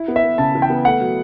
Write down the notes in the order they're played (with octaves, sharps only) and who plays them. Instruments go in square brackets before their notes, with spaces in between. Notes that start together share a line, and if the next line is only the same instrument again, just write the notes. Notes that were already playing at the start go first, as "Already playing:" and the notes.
Already playing: [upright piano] E4
B3
[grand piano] E5
[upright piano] B3
[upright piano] C#3 [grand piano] A5
[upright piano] E3
[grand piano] G5
[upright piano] B3
[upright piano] A3 [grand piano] F#5
[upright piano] F#3